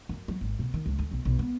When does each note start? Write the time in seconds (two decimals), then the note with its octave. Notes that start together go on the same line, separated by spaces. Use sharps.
0.09 F#2
0.28 F#3
0.41 G#1
0.59 B2
0.74 D#3
0.86 C#2
0.99 D2
1.11 B1
1.25 B1
1.39 B3